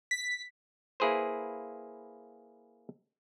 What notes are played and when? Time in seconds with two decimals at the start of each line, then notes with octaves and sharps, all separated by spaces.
0.11 B6
1.00 A#3 E4 G#4 B4 C5